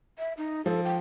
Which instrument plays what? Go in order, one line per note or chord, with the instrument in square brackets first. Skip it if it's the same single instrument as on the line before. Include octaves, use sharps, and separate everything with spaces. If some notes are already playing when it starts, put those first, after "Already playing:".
[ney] E5
D#4
[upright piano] F3 [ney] A4
[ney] G5